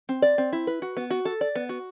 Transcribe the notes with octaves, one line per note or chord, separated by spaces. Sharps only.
C4
D5
C4
E4
B4
F#4
B3
F#4
A4
D5
B3
F#4